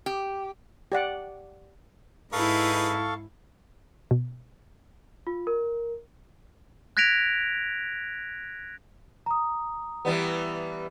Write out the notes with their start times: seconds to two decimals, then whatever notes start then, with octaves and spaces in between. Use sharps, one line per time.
0.06 G4
0.92 G4 D5 F#5
2.32 G#2 D#4 E4 G#4 A4 B4 F5 C#6
4.11 B2
5.27 F4
5.47 A#4
6.97 F#6 G#6 A#6 B6 D7 F7
9.26 A#5 D#6
10.05 E3 G3 B3